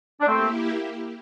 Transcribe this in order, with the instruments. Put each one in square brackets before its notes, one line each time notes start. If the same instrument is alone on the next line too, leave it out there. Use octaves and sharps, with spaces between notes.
[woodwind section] D4
[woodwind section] A3 C4 [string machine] A#3 E4 G4